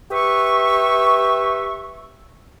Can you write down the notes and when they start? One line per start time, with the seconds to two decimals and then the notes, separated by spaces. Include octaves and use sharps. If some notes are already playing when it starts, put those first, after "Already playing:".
0.11 G4 B4 E5 C#6